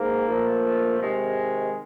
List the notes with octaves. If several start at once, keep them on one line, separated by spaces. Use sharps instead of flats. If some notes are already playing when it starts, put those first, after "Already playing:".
Already playing: G#2 A#3
A#2 F3 A3
C3 D#3 G#3